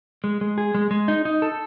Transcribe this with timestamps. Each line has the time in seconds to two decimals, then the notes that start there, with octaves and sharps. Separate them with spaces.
0.24 G#3
0.41 G#3
0.58 G#4
0.75 G#3
0.91 G#3
1.08 D#4
1.25 D#4
1.42 A4